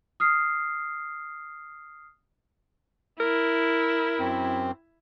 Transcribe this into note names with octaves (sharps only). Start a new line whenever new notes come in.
D#6 F6 C7
E4 A#4
F#2 C4